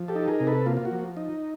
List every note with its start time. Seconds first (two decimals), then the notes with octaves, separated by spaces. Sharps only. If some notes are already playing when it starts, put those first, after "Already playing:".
Already playing: F3
0.08 G4 A4
0.15 D#4
0.28 G#4 A#4
0.40 C3
0.47 A4 B4
0.66 A#3 F4
0.77 F4
0.85 F#4
0.91 F3
1.17 D#4